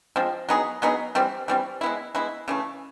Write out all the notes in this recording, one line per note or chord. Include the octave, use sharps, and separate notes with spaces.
F3 G#3 C4
F#3 B3 D#4 G#4
F#3 B3 D#4 G#4
E3 G3 C4
E3 G3 C4
G#3 B3 E4
G#3 B3 E4
C#3 E3 A3